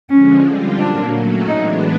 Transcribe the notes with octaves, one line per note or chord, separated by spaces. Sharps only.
D3 F3 G#3 C#4
D3 G3 C4 F4
A#2 F#3 A#3 D4
F#3 A3 C#4 F#4
A2 E3 G#3 B3 D4 D#4